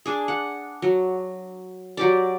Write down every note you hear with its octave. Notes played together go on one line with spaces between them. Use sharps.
D4 G#4
F#5
F#3
F#3 G4 D5